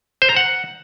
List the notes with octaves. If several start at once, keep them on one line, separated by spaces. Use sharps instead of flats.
C5
A#5
F#5